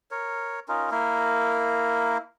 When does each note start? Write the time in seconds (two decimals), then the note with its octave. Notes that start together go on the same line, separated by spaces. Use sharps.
0.11 A#4 C#5
0.68 C#4 D#4 F4 A#4
0.91 A#3 E4 A#4